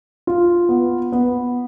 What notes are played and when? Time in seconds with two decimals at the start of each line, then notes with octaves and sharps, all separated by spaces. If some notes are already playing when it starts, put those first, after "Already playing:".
0.27 F4
0.69 B3
1.12 B3